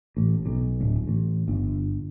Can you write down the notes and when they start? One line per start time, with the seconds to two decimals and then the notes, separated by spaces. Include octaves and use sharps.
0.17 A1
0.46 B1
0.80 D1
1.07 A1
1.48 G1